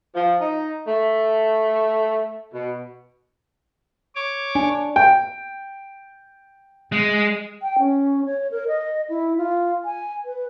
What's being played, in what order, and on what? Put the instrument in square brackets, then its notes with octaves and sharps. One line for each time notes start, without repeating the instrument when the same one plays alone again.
[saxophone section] F3
D#4
A3
B2
[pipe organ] C#5 D6
[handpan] D4 [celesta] G#5
[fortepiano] G5
[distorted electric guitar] G#3
[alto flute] G5
C#4
C#5
A#4
D#5
E4
F4
G#5
B4